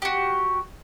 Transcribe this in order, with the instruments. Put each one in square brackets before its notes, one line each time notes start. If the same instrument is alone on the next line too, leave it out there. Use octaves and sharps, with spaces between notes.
[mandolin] F#4 G4